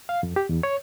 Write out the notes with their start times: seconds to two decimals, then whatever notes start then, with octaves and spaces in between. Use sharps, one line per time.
0.09 F5
0.23 F2
0.36 G4
0.49 E2
0.63 C#5